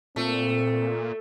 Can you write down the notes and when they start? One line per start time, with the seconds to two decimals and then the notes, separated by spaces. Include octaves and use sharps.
0.16 A#2 A3 C4